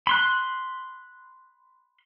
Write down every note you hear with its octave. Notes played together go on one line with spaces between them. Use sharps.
B5 C6 F#6